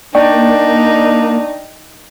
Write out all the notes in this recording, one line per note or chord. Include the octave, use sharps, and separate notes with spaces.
A#3 D4 D#4 D5 G5 C#6